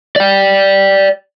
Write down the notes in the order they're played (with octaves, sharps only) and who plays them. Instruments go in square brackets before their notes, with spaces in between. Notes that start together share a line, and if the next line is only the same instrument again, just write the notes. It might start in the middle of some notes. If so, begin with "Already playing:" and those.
[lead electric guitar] D5 G5